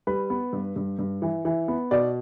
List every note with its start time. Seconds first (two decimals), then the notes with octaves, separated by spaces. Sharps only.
0.07 G3 B4
0.30 B3
0.53 G2
0.76 G2
0.99 G2
1.22 E3
1.45 E3
1.68 B3
1.91 B2 D5